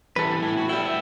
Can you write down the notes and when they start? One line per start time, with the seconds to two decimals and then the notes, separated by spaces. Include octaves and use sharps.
0.16 E3 G3 A4 B4
0.42 A2 E4 G#5
0.57 F#4
0.69 G3 B3 E4 G5
0.86 E5